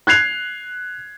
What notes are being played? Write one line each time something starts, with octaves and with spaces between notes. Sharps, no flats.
F#6 G#6 C7 F7